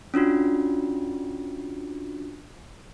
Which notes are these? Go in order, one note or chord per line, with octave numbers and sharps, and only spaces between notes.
C#4 D4 F4 F#4